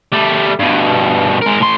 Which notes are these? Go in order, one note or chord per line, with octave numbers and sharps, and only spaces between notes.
G3 A3
G2 B2
G#3 A#4
A2 C6